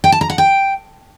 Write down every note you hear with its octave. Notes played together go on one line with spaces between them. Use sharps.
G5
A5
A#5
F#5
G5